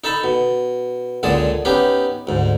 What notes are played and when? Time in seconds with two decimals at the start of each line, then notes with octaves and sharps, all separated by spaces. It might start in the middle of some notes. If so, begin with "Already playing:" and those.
0.04 D#4 A4 A5 B5
0.24 B2
1.23 C#2 A#2 D3 G#4 A5
1.65 B3 C#4 D#4 G4
2.27 D2 G#2